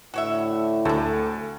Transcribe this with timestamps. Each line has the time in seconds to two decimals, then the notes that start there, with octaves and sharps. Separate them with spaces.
0.14 A2 D3 E4 F#4 C#5 E5
0.85 D2 C4 D4 A4